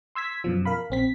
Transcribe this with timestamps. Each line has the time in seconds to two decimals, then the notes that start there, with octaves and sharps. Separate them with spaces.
0.15 C6 E6 G#6 B6
0.44 F#2 B2 F3
0.65 A#4 F5 B5
0.90 A#1 C4 B6